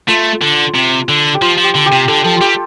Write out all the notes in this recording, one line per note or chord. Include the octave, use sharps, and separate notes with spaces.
A3 F4
D3
C3
D3
G4
F3 F4
F3
G4
D3
G4
C3
D3 A4
F3 A4
F4
G3 G4